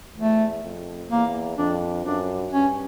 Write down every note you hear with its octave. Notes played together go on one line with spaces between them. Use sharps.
E2 A3
F2
E2 A#3
F2 D4
F#2 D4
G2 C#4